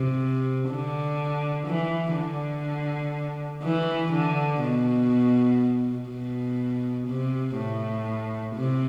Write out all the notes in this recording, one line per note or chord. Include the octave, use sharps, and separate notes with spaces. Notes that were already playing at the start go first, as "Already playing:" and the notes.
Already playing: C3
D3
E3
D3
E3
D3
B2
B2
C3
A2
C3